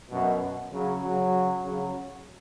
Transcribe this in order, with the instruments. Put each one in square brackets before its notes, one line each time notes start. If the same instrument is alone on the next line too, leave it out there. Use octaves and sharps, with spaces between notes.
[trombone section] F#2 B2
C#3 F#3
C#3 F#3
C#3 F#3